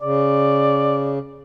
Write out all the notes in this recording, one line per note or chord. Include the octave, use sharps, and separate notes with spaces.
C#3 D5